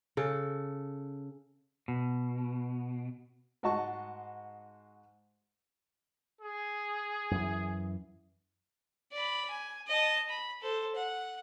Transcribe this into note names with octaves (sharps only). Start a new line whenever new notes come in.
C#3 A4
B2
G#2 F#4 D#5 A5 C#6
G#4
F#2 E3
D5 B5
G#5
D#5 A5
B5
A4 C5
F#5